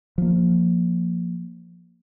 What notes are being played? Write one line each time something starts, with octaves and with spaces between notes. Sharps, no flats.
F3 A#3